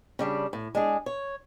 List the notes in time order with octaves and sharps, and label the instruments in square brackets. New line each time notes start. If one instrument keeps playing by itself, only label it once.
[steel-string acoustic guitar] C#3 G3 D4
A2
G#3 D4 G#4
C#5